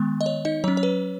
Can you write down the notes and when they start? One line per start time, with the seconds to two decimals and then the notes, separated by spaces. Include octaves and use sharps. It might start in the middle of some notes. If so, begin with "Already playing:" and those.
Already playing: D#3 G#3 B3
0.21 D#5
0.26 C#5
0.45 D#4 D#5
0.64 F#3 C#4 C#5
0.77 C#5
0.83 B4